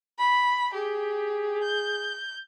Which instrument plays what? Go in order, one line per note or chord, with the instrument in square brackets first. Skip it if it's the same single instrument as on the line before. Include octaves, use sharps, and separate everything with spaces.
[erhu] B5
[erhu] G4 [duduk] G#4
[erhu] G6